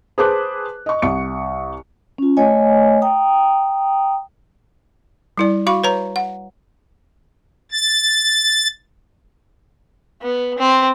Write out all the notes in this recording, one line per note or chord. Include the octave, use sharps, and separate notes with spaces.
G#4 B4 C5 A5 D6 F#6
D#5 C#6
C2 C#6 C#7
C#4 F4
A3 C#5 D#5 G#5
G5 A#5 D#6
G3 E4 D5
F#4 F5 B5 C#6
B4 C#5 A#5
F#5
A6
B3
C4